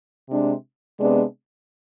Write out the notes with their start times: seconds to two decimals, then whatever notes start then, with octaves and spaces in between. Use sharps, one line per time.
0.29 C3 G#3 D4
0.99 C3 G#3 B3 D4